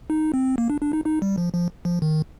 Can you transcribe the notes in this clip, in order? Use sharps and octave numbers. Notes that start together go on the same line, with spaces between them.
D#4
C4
A#3
D4
D4
D#4
D#4
G3
F3
F3
F3
D#3